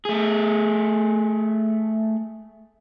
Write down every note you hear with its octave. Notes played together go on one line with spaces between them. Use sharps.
A3 G#4